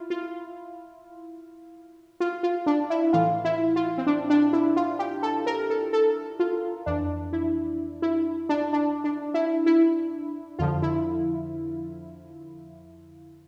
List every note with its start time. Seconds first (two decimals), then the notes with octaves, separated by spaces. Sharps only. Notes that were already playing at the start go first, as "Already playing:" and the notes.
Already playing: E4 F4
0.10 F4
2.20 F4
2.43 F4
2.66 D4
2.90 E4
3.13 A2 E3 F4
3.45 E4
3.76 F4
3.98 C4
4.07 D4
4.30 D4
4.53 E4
4.76 F4
4.99 G4
5.23 A4
5.47 A#4
5.70 A4
5.93 A4
6.40 F4
6.86 F2 E3 D4
7.33 E4
8.02 E4
8.49 D4
8.73 D4
9.04 D4
9.34 E4
9.66 E4
10.59 F2 D3 F3 F4
10.82 E4